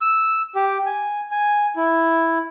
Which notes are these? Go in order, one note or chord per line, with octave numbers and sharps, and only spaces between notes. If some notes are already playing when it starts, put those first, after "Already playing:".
E6
G4
G#5
G#5
E4